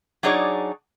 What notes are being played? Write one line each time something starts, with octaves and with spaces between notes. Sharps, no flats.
F#3 D4 D#4 G#4 C#5 D5